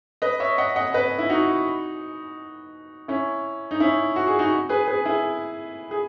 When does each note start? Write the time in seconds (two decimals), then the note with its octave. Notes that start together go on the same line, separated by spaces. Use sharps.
0.22 B4 D#5
0.40 C#5 E5
0.58 D#5 F#5
0.76 D#5 F#5
0.94 B4 D#5
1.19 E4
1.29 D#4 F#4
3.08 C#4 E4
3.71 D#4
3.80 C#4 E4
4.16 F#4
4.27 G#4
4.39 D#4 F#4
4.69 G#4 B4
4.87 G#4 B4
5.05 E4 G#4
5.91 G#4